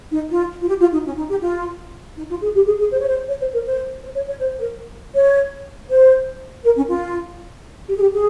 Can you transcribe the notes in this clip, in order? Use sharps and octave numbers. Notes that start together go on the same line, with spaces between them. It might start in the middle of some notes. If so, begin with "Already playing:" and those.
D#4
F4
F4
G4
F4
D#4
C#4
D#4
G4
F4
D#4
F4
G#4
G4
G#4
G#4
C5
C#5
C5
C#5
C5
A#4
C5
C5
C#5
C#5
C5
A#4
C#5
C5
A#4
C#4
F4
G4
G#4
G4
G#4